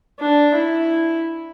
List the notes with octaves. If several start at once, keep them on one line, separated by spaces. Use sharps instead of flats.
D4
E4